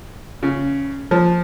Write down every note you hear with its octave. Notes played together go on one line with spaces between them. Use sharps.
C#3
F3